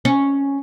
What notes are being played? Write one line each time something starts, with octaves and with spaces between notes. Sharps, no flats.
C#4